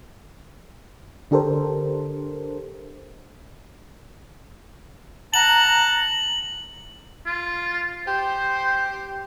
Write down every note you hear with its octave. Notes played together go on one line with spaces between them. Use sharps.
D3 D4 G4 A4 A#4 C5
F#5 A5 A#5 F#7
F4
G4 C5